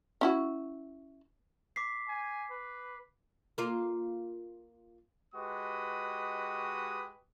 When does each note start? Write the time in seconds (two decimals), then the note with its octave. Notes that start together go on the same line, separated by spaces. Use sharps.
0.21 C#4 E4 F#4
1.76 D6 B6 C7
2.08 G#5
2.51 B4
3.58 A#3 F4
5.34 G#3 F#4 G4 B4 D#5 D#6